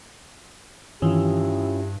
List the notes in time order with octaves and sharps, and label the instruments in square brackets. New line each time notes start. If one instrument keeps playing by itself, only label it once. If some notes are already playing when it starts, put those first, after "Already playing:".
[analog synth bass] G2 [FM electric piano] D#3 E3 [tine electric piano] C#4 F4 [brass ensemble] E4 G4